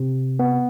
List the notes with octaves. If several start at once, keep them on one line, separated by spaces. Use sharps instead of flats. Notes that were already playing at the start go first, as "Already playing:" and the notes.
Already playing: C3
B3